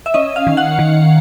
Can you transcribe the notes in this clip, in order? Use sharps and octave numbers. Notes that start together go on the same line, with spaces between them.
E5
C#4 D#5
F5
D#3
F#5
D#3